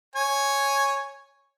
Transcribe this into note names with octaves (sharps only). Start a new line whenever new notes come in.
C#5 G#5